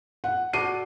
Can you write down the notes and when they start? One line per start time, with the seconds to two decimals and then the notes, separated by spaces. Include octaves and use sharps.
0.24 F#5
0.53 F#4 A4 D5 C7 D#7